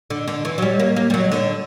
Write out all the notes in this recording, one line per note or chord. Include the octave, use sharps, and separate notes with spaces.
D3
D3
E3
F#3
G3
A#3
A#3
G3
F#3
D3